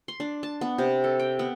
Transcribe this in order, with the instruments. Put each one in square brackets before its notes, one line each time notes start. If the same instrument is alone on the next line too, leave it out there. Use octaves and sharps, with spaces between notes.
[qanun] C6
D4
A5
B3
C3
A4
G5
B3